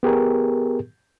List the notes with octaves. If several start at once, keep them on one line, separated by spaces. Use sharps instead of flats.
B3 G4 G#4 A#4